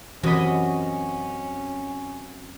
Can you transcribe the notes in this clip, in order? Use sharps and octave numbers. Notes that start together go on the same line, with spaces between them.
F#2 C3 E3 C#4 F#4 D#5 B5